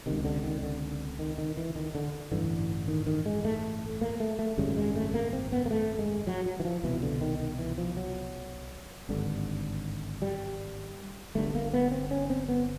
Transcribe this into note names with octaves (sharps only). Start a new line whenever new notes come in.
C#2 C3 D#3
D3
D#3
D3
D#3
D#3
E3
D#3
D3
A1 G2 D3 E3
D#3
D#3
G#3
A3
A#3
A3
A3
G#1 F#2 C#3 G3
G#3
A3
A#3
C4
B3
A#3
A3
G#3
F#3
F#3
E3
F3
C2 B2 E3
D3
D#3
D#3
E3
F3
F#3
G#1 G2 D3
G3
G1 G2 D3 A3
A#3
B3
C4
C#4
C4
B3